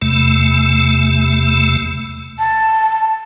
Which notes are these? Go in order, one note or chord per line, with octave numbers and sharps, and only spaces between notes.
E2 C3 A3
A5